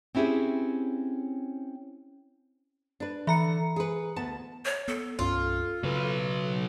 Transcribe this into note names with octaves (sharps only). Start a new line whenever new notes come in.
C4 C#4 E4 G4 G#4
D4 B4
D3 E3 A#5 C#7
G#4 B4
D2 B3 A5
C#5
B3 A4
C2 G2 C#4 F4
C#3 F#3 B4